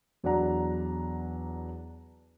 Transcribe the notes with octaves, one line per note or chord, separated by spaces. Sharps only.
E2 F#3 D4 D5 F#5 A#5